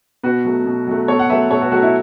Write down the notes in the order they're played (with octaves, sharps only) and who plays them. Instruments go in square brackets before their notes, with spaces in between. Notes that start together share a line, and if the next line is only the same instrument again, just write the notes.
[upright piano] B2 F#4 B4
F#3 A3
B2
F#3 A3
B2 A4 C#5
F#5
F#3 A3 B4 E5
B2 A4 C#5
F#4 B4
F#3 A3 F#4
E4